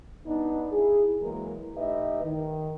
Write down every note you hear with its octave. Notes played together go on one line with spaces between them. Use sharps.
G2 B3 D4 D#4
E4 G#4
E3 F#3 G#3 A#3 A#4
A2 D#4 G4 B4 D#5 E5
D#3